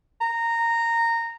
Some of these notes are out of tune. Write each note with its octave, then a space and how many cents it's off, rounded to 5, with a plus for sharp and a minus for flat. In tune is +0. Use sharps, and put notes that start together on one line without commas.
A#5 -15